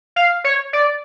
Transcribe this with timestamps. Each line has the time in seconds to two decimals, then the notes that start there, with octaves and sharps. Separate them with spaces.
0.16 F5
0.44 C#5
0.73 D5